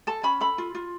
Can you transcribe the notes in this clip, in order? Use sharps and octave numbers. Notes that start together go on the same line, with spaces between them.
A4 A5
C#4 B5
A4 B5
F4
F4